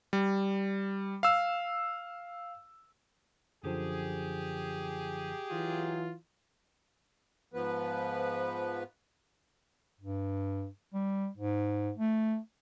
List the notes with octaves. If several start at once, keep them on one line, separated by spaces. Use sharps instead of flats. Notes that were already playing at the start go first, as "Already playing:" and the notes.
G3
F5 E6
F#2 D3 F3 G4 G#4
E3 F#3 F4
G#2 F3 B3 B4
G2
G3
G#2
A3